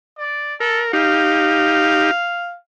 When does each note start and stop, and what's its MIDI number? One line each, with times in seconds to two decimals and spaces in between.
0.19 0.54 74
0.60 0.83 69
0.60 0.92 70
0.93 2.11 63
0.93 2.11 67
0.93 2.56 77